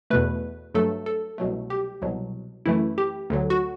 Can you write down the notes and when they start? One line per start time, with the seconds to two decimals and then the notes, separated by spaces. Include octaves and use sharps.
0.10 E2 B2 A3 B4
0.74 G2 F#3 A3 A4
1.06 A4
1.38 C2 B2 F#3 A3
1.70 G4
2.02 C2 B2 F#3
2.66 F#2 E3 A3 E4
2.98 G4
3.30 D2 D3 F#3
3.50 F#4